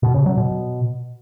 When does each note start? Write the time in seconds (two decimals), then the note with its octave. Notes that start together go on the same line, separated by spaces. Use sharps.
0.03 B2
0.14 C#3
0.26 F#3
0.37 B2